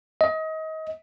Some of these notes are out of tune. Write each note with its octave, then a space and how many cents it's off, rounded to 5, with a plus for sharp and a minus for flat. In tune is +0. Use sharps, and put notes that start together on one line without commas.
D#5 +30